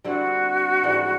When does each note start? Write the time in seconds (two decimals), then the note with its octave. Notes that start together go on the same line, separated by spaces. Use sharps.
0.04 D3 G3 C4 E4 F#4
0.83 G#2 E3 G3